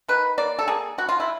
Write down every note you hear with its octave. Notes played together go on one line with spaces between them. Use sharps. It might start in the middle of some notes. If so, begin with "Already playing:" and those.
D#3 B4
A#3 D5
A4
A#3 G#4
G3 F#4
F4
E4